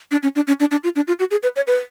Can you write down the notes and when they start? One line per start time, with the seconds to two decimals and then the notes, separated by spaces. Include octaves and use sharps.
0.11 D4
0.23 C#4
0.36 D4
0.47 C#4
0.60 D4
0.71 D4
0.84 F4
0.96 D4
1.08 F4
1.19 F#4
1.31 G#4
1.43 B4
1.56 C#5
1.67 B4